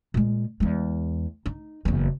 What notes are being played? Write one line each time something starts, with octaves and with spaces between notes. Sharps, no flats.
A#2 G#3
E2 G#3
D#4
F#1 E2